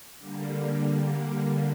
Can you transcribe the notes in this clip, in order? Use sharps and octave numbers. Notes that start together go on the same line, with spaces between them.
D3 G3 A#3